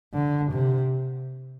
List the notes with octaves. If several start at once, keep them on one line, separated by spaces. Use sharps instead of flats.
D3
C3